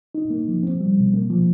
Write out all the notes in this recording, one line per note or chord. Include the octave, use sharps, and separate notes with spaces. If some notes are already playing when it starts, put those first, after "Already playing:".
D#4
A#3
F3
C4
G3
B2
A#3
F3